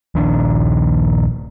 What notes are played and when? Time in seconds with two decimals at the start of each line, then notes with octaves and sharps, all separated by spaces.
0.15 D#1 A#1 D#3 D4